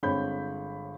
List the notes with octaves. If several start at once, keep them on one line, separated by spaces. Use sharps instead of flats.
G1 G#3 C4 C#5 B5 G6